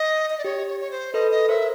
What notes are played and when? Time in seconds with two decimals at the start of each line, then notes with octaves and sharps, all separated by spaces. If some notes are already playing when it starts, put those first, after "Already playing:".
Already playing: D#5
0.30 D#5
0.38 D5
0.44 G4 C#5
0.68 C#5
0.80 C#5
0.91 C5
1.13 A4 B4 D#5
1.31 D#5
1.49 A#4 C5 E5